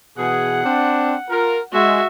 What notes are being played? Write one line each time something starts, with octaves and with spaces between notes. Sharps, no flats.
B2 E3 G#4 F#5
C4 D4
F4 A#4
G#3 F#4 E5